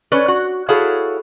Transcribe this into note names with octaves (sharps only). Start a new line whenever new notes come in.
C#4 B4 C#5 D5
F#4
E4 F#4 G#4 A4 C#5 F5